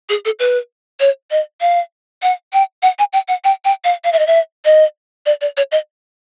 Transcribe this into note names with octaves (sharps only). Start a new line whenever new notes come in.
G#4
A4
B4
C#5
D#5
F5
F#5
G5
F#5
G#5
G5
F#5
G5
G5
F5
F5
E5
D#5
E5
D#5
D5
D5
C#5
D#5